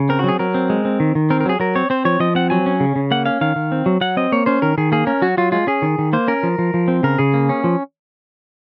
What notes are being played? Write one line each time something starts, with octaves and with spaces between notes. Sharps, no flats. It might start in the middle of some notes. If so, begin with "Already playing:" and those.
Already playing: C#3
C4 A#4
F#4
F#3 G#4
F#3 A#4
C4
G#3
C4
D#3
D#3
C4 A#4
A#4
F#3 G#4
F#3 A#4
C4 C#5
C4 C5
F3 C#5
F3 D#5
C4 F#5
F#3 G#5
C#4
C#3
C#3
A#3 F#5
C#4 F5
D#3 F5
D#3
C4
F#3
F#3 F#5
C4 D#5
A#3 C#5
C#4 C5
D#3 A#4
D#3 G#4
A#3 G#4
C#4 A#4
F#3 F#4
F#3 F4
G#3 F4
C#4 G#4
D#3
D#3
A#3 C5
C#4 A#4
F3
F3
F3
C4
C#3 A#4
C#3 G#4
A#3
C#4
F3